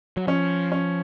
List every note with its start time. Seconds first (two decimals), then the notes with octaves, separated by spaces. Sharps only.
0.17 F#3
0.27 F3 C#4
0.72 C#4